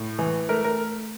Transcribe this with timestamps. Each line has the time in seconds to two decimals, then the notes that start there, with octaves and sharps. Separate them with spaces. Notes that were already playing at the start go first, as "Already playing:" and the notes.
Already playing: A2
0.19 E3
0.49 A3 A#4
0.64 A#4